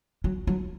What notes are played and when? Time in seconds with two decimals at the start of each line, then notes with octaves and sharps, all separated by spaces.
0.24 F#3
0.47 F#3